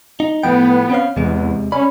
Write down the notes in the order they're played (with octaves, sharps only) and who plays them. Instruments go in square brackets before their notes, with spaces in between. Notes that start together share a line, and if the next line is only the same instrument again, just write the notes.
[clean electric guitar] D#4
[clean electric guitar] A2 F3 G5 [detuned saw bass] B3
[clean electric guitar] C4 C#4 F5
[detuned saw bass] E2 [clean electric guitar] C3 G#3
[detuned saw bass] C#4 [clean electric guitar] D5 B5